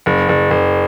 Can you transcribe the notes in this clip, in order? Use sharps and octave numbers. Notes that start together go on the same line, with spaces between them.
F#1
F#1
F#1